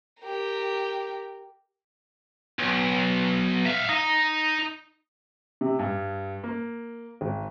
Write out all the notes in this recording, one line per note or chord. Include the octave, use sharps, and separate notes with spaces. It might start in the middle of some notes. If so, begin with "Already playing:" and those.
G4 A#4
B1
E5 F5
D#4
C3
G2
A#3
G#1